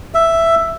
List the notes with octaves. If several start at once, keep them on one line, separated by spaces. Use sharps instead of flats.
E5